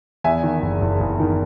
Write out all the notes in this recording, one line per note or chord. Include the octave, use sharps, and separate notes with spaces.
E2 E5 G#5
D#3
F#1
F#1
F#1
D#3